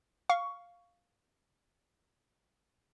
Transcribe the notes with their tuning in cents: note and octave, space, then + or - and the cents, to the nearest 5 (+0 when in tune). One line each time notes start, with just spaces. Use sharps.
F5 +5 C#6 +15